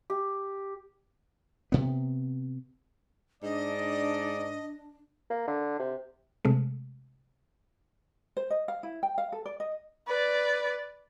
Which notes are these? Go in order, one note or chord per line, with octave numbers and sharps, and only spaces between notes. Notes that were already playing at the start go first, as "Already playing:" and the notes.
G4
C3 B3
G#2 D4 D5 D#5
A#3
D3
C3
C3 G#3 A3
C5
D#5
F5
E4
G5
F5
A4
D5
D#5
B4 D5